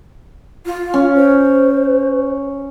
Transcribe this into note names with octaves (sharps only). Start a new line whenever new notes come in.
F4
C#4
C5